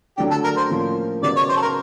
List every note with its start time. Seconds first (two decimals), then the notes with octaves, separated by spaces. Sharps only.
0.17 D3 F#3 A3 D4 G4
0.31 A4
0.44 A#4
0.57 C5
0.70 A2 F3 A#3 C#4
1.23 C#3 F#3 B3 D#4 D5
1.36 C#5
1.49 C5
1.56 A4
1.62 A#4